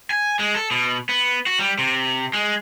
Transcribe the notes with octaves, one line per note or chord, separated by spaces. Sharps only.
G#5
G#3
A4
B2
B3
F#4
G3
C3
G#3